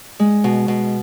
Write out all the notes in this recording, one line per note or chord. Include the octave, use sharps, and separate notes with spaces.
G#3
B2
B2